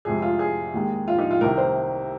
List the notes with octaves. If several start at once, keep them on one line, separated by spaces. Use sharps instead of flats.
F2 C3 G#3 G#4
F4
G#4
D#2 D#3 G#3
F4
D#4
F4
C2 C3 D#3 A#4
C5